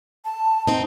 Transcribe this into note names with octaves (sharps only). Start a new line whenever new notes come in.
A5
C4 D#4